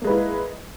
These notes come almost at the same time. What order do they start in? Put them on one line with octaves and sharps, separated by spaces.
A#3 G#3 B4 E4